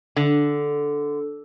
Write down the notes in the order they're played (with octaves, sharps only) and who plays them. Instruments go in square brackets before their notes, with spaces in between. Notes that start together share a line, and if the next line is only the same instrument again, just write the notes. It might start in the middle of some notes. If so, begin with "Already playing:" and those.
[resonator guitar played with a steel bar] D3